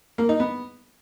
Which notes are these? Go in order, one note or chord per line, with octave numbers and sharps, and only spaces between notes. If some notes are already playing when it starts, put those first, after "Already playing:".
A#3
D#4
B3